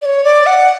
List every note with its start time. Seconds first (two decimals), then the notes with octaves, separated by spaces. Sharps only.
0.02 D5
0.06 C#5
0.24 D5
0.46 F#5